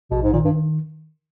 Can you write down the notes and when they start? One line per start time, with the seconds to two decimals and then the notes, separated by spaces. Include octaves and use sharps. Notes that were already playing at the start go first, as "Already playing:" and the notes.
0.11 A#1 B2
0.23 G#2
0.33 A#2 D#3
0.45 G2